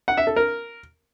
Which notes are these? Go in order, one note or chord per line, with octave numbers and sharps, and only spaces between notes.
F#5
E5
A4
A#4